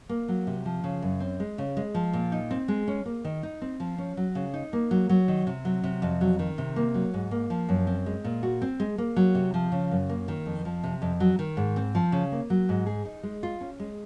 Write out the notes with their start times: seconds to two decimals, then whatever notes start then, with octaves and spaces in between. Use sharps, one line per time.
0.09 A#3
0.28 F#3
0.47 C3
0.65 F3
0.84 C#3
1.02 F#2
1.20 C4
1.40 G#3
1.58 C#3
1.77 G#3
1.94 F3
2.13 A#2
2.32 D#4
2.51 C4
2.68 G#3
2.88 C#4
3.06 A#3
3.25 D#3
3.43 D#4
3.62 C4
3.80 F3
3.98 C#4
4.17 F#3
4.35 C#3
4.54 D#4
4.73 A#3
4.91 F#3
5.09 F#3
5.28 D#3
5.47 C3
5.65 F#3
5.84 C3
6.02 F2
6.21 F#3
6.39 D#3
6.58 C3
6.76 A#3
6.94 F#3
7.14 G#2
7.31 A#3
7.50 F3
7.69 F#2
7.87 C4
8.06 G#3
8.24 A#2
8.43 F#4
8.62 C4
8.80 G#3
8.98 A#3
9.16 F#3
9.35 C3
9.54 F3
9.72 C#3
9.91 F#2
10.09 A#3
10.28 D#3
10.46 F2
10.65 F3
10.83 C3
11.02 F2
11.20 F#3
11.39 D#3
11.57 G#2
11.76 C4
11.95 F3
12.12 C#3
12.32 A#3
12.50 F#3
12.69 G#2
12.86 G#4
13.05 D#4
13.23 G#3
13.43 F4
13.60 C#4
13.79 G#3